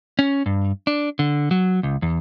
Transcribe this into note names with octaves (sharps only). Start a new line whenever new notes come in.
C#4
G2
D4
D3
F#3
C#2
E2